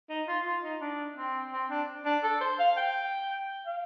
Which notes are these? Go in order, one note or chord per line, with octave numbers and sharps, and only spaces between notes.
D#4
F4
F4
D#4
D4
C4
C4
D4
D4
A4
C5
F5
G5
F5